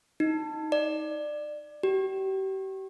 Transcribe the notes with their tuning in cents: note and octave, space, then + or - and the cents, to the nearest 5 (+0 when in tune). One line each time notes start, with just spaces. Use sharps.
D#4 +10
D5 +20
G4 -35